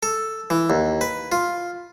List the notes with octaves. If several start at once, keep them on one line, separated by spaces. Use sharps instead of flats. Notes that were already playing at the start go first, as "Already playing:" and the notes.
A4
E3
D#2
B4
F4